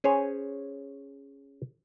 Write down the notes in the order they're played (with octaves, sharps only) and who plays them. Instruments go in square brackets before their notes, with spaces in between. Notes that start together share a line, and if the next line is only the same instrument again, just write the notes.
[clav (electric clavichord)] C#4 G#4 C5 C#5